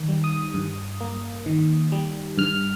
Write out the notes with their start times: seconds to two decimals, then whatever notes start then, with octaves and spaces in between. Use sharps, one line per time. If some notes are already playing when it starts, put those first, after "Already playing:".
Already playing: D#3
0.08 G3
0.24 D#6
0.54 G2
1.00 A#3
1.46 D#3
1.92 G3
2.38 G2 F6